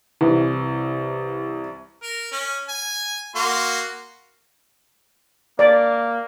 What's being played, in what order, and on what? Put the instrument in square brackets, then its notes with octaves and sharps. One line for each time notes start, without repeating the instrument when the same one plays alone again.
[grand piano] C2 [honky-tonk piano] E3
[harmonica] A#4
C#4
G#5
A#3 F#4 C6
[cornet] A#3 [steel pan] D5